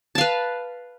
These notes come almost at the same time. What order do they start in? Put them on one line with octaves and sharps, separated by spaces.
A5 F5 B4